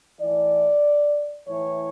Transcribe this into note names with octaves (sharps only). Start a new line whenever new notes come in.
A2 E3 D5
A2 E3 C#5